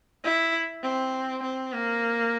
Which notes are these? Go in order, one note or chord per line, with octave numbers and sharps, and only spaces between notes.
E4
C4
C4
A#3